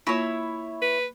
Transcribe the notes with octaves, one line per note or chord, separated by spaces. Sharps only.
A#3 E4 F4 C#5 C#6
B4